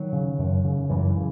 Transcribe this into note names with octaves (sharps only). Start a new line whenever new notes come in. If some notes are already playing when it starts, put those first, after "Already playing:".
Already playing: D#3 F#3
C#3
F#2
C#3
F#2 E3
C#3